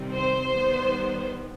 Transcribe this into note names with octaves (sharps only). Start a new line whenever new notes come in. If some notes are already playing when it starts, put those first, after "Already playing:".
Already playing: C3 D#3 G3 C4
C5
D#3 G3 B3